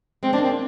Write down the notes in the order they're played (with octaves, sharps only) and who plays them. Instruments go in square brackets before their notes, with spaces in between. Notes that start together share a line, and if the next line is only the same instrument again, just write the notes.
[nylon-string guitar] G#3 [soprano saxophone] C4
[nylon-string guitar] C4 [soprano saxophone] D4
[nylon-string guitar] A#3
[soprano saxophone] C4